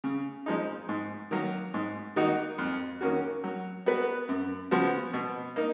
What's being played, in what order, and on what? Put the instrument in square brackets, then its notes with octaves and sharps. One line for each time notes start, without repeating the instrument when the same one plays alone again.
[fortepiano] C#3
F3 G#3 D#4
G#2
D#3 F#3 A#3
G#2
D#3 A#3 D#4 F#4
F2
D#3 A#3 C#4 F#4
F#3
B3 F#4 B4
F#2
C#3 F3 B3 F#4
B2
A#3 D#4